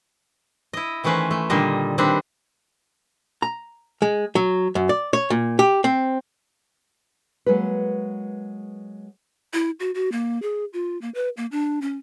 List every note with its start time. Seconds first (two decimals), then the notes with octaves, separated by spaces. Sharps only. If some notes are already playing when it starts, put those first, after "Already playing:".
0.73 E4 D#5
1.04 D#3 E3 A3 C#4 B4 C5
1.31 A3
1.50 A#2 D3 D#3 G3 A#4 D#5
1.98 D#3 G3 C4 D4 G4 B4
3.42 A#5
4.02 G#3
4.35 F#3
4.75 F#2
4.89 D5
5.13 C#5
5.30 A#2
5.59 G4
5.84 C4
7.46 F#3 G#3 A#3 B4
9.53 E4
9.80 F#4
9.95 F#4
10.12 A#3
10.42 G#4
10.73 F4
11.01 A#3
11.15 B4
11.37 A#3
11.52 D4
11.82 C#4